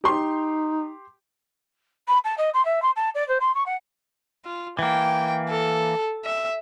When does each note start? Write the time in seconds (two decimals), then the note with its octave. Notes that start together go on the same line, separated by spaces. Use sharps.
0.04 D#4 G4 C6
2.08 B5
2.24 A5
2.38 D#5
2.54 C6
2.65 E5
2.82 C6
2.96 A5
3.15 D5
3.28 C5
3.40 C6
3.55 C#6
3.66 F#5
4.45 F4
4.79 E3 A#3 G5
5.50 A4
6.25 E5